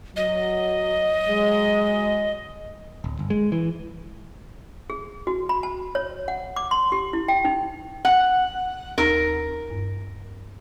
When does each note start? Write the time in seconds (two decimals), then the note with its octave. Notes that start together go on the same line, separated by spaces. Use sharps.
0.16 F#3 D#5
1.28 F#3 G#3
3.04 D1
3.19 G1
3.30 G#3
3.52 E3
4.90 G#4
5.27 F#4
5.49 B5
5.63 A5
5.95 C#5
6.28 F#5
6.56 D6
6.71 C6
6.92 G4
7.13 E4
7.28 G5
7.45 D#4
8.05 F#5
8.98 D#2 D#4 A#4 E6
9.70 G2